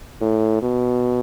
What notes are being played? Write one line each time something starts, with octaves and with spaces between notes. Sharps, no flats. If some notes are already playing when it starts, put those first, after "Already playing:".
A2
B2